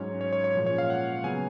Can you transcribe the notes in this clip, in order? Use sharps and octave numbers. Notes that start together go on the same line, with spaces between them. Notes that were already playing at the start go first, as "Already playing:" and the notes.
Already playing: G#2 F#3 C#4 C#5
C#5
C#5
C#5
A#2 F3 G#3 C#4
C#5
F5
F#5
C#3 F#3 B3 G#5